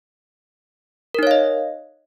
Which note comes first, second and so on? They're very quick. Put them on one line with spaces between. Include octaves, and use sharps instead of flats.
A#4 D#4 C#5 F5 D#5